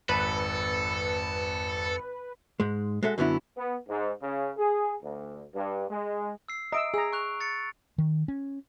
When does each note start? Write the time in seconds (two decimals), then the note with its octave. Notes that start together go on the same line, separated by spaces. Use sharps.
0.09 G#1 F2 A4 B4 A5 B5 C#7
2.60 G#2 G#3
3.03 G#3 F#4 A4 E5
3.18 F#2 D3 F#3 B3 C#4 E4
3.57 B3
3.88 G#2
4.22 C#3
4.57 G#4
5.03 D2
5.55 G2
5.89 G#3
6.48 E6 C7
6.72 D#5 E5 A#5 E6 D7
6.94 G#4 A#5 E6
7.13 C#6 F#6 F7
7.41 A6 C#7
7.98 D#3
8.28 C#4